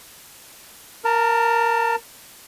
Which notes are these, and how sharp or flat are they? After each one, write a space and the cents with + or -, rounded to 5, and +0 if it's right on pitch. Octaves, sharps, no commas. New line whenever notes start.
A#4 +0 A5 +25